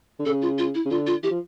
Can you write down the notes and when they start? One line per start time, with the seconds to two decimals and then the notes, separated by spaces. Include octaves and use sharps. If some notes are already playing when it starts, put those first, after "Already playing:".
0.19 D3
0.26 C#3 A4
0.42 F4
0.58 F4
0.75 E4
0.86 C#3
0.91 D3 F4
1.07 F4
1.23 E3 G4
1.31 F3